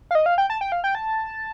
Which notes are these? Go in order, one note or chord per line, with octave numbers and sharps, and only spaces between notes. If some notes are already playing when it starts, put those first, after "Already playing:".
F5
D#5
F5
G5
A5
G5
F5
G5
A5